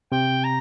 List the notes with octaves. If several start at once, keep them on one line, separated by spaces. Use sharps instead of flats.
C3 G5
A#5